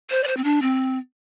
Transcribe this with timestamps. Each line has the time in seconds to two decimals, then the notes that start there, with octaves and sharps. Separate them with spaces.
0.10 C5
0.23 D5
0.27 C5
0.37 C4
0.44 D4
0.62 C4